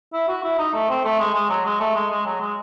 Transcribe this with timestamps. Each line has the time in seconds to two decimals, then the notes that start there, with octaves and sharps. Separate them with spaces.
0.13 E4
0.28 F#4
0.44 E4
0.59 D#4
0.74 A3
0.89 C4
1.05 A3
1.19 G#3
1.34 G#3
1.50 F#3
1.65 G#3
1.80 A3
1.95 G#3
2.10 G#3
2.26 F#3
2.41 G#3